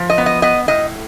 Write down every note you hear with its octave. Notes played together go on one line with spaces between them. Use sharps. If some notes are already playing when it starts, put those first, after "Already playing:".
Already playing: F3
D#5
B3
D#5
B3 D#5
A2 D#5